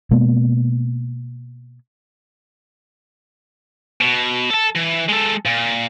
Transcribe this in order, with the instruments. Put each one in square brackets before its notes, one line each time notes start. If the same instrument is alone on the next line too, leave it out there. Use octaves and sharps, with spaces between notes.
[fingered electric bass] B2 G#3 A#3 B3
[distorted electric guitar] B2
A4 A5
E3
G#3 A4
A#2